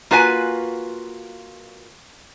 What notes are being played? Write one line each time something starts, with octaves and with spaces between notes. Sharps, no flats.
A#3 F4 F#4 B4 F#5 G#5